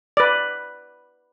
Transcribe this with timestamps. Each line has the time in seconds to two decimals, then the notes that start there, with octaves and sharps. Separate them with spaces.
0.17 B4 D5